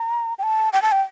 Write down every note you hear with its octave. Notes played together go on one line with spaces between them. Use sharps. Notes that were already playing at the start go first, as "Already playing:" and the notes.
Already playing: A#5
G5
A5
G5
A5
G5